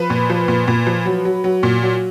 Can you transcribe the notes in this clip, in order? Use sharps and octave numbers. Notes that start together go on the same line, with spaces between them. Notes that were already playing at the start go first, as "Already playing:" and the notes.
Already playing: F3 B4
A#2
F3
A#2
A#2
F3
F#3
F#3
F#3
A#2
F#3